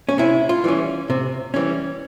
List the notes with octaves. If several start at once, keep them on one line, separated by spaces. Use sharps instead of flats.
C#4
C3 E4
F4
E3 G3 C#4
C3
E3 G3 C#4